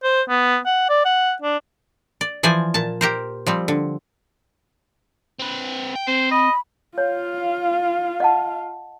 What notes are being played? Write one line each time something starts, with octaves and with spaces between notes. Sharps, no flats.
C5
B3
F#5
D5
F#5
D4
D5
E3 F3 C5 D5 G#5
A#2 A5
G4 A#4 C5
F3 G3 C4
D3
C4 B4
G5
C4 C5
D#5 B5
F4 C#5 F5
D#5 F#5 A5